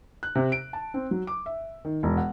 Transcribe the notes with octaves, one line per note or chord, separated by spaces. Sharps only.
F#6
C3
D7
A5
C4
F#3
D6
E5
D#3
E1
F#5